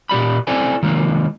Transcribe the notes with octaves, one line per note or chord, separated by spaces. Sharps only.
A#2 G4 D5 B5
C4 E4 A4 C5 D5 G#5
D#3 F3 G#3 A#3